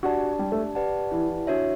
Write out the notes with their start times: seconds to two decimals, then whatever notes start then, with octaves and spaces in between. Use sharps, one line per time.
0.03 D4 F#4 G4 D5 A5
0.39 G3
0.52 A3
0.75 G4 B4 D5 F#5 A5
1.12 E3
1.29 E3
1.47 D4 F#4 C#5 E5